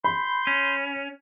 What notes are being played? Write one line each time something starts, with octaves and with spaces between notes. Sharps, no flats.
B5 C6 G6
C#4